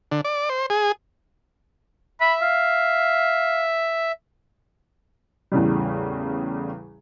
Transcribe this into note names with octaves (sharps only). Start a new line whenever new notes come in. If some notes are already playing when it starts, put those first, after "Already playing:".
D3
D5
C5
G#4
E5 B5
F5
E2 A2 C#3 G3